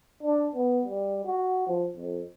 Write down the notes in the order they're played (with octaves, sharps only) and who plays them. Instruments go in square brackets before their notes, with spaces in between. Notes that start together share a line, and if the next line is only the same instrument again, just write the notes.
[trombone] D4
B3
G3
F#4
F3
F2